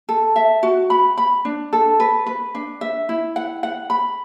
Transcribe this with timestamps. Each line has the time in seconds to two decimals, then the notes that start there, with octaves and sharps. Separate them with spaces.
0.09 A4
0.36 E5
0.63 F#4
0.90 B5
1.18 B5
1.45 D4
1.73 A4
2.00 B4
2.26 B4
2.55 D4
2.81 E5
3.09 E4
3.36 F#5
3.63 F#5
3.90 B5